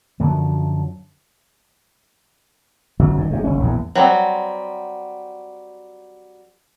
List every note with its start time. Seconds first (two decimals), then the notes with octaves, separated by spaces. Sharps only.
0.20 F#2 D3 F3 F#3
2.99 G1 F#2 F#3
3.17 G2 D#3
3.31 F#2 D#3 G#3
3.44 F#1 C#4
3.60 A#1 E2 G#2
3.95 F#3 G3 C4